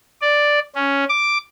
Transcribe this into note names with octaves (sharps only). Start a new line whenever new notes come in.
D5
C#4
D6